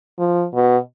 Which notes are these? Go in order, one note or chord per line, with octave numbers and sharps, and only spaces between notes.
F3
B2